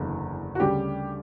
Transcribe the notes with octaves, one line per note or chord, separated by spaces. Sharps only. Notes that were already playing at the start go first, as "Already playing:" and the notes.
Already playing: F#1 E2 D3
F#4
D2 C#3 G3 G4